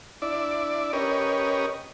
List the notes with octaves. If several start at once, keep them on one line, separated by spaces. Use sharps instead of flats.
D4 E4 D5
C#4 G4 A#4 B4 C#5 D#5